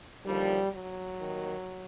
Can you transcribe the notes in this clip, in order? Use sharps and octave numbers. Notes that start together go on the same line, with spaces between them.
D#2 D3 F3 G3
F#3
D#2 D#3